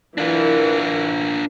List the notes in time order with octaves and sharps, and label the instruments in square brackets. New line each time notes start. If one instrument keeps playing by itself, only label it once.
[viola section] E3 A#4 [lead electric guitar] D4 F4